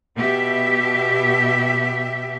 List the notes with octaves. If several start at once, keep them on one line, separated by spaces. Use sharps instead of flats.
B2 G4 E5